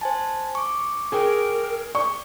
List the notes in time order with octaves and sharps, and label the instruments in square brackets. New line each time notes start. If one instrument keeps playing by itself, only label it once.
[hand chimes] C5 G#5 A5
C#6 D6
[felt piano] G#4 G5 [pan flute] A#4
[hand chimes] D5 [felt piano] C#6